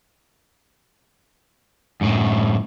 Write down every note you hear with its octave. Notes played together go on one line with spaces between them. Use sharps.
F#2 A2